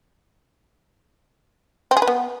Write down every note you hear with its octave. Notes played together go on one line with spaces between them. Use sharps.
C4
G#4
B4
B3